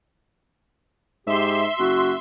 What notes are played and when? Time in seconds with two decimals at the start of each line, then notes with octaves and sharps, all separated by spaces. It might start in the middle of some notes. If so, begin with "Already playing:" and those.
1.27 G#2 G4 E5 C6
1.79 F#1 F#4